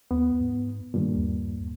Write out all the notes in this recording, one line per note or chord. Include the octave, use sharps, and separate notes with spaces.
D#2 B3
G#2
G2 A#2 D#3
D#2